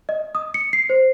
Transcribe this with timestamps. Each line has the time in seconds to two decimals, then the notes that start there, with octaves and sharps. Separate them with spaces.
0.09 D#5
0.35 D#6
0.54 C#7
0.73 C7
0.90 C5